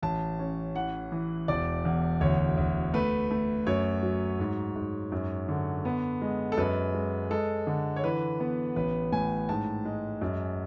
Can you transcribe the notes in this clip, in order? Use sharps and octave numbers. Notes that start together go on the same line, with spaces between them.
A1 A5
C#4
E3 F#5
E3
E1 D5
E2
D2 C#5
D2
A3 B4
A3
F#2 C#5
F#3
G#2
G#2
F#2
D3
B3
G#3
A4
F#2 B4
G#3
G#3 A4
D3
C#5
E3 B4
B3
A1 B4
A2 G#5
G#2 A5
G#3
F#2